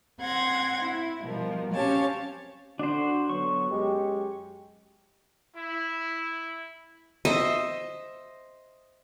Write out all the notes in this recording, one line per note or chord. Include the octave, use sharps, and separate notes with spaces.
C4 F#5 C6 G#6 A#6
E4
B2 F3 G3 A#4
C4 C#4 G4 C#5 F5 A5
D3 D4 F#4 C5
D3 F#3 B3 C#6
F#2 G#3 G4
E4
C5 D#5 E5